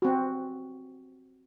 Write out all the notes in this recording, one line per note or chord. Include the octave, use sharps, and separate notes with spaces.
C4 F#4